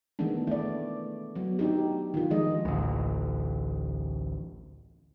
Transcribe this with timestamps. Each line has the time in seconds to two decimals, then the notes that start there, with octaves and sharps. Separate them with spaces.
0.19 D#3 E3 G#3 A3 B3 D4
0.47 A3 D5
1.36 F#3 B3
1.59 D4 D#4 G4
2.14 D#3 F4
2.30 D#3 F3 G#3 D#5
2.65 A1 D2